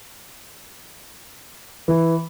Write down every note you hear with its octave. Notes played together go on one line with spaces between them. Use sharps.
E3